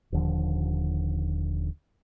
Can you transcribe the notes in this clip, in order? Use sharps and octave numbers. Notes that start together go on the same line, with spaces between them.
D#1 D#2 D3 F3